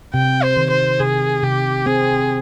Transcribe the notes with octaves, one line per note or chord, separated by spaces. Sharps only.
C3 G5
C5
D#3
C5
C3 G#4
C3 G4
C4 G#4